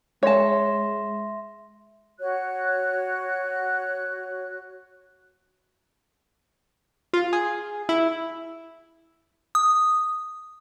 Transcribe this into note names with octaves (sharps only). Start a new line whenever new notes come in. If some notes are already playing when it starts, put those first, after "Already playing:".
G#3 C#5 E5 A5 C6 A#6
F#4 C#5 F#6
F4
G#4
E4
D#6